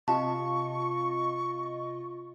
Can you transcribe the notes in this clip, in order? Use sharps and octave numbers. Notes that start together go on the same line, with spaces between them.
C3 F4 D#5 A5 C#6